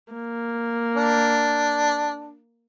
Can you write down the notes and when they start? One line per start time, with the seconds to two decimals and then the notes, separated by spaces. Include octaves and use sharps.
0.13 A#3
0.97 D4